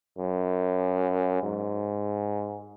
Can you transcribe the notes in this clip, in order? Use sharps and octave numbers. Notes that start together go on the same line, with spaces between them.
F#2
G#2